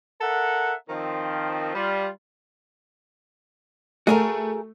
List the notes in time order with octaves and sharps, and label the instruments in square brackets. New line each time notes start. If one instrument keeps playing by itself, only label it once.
[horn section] A4 A#4 E5 F#5
D#3 F3 C4
G3 F4
[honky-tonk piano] A3 [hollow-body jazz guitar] F#4 G#4 A#4